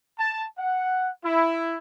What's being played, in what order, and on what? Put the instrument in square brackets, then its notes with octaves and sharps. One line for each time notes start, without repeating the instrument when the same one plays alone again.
[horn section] A5
F#5
E4